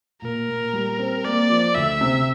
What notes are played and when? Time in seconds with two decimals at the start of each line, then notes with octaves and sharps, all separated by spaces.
0.22 A#2 A#4
0.48 A#2
0.73 G3
0.99 C4
1.25 A#3 D5
1.50 F3
1.75 D2 E5
2.01 C3